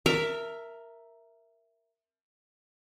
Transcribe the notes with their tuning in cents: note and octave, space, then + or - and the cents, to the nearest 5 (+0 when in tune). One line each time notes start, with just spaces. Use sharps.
A#4 +0 E5 +5 A5 +40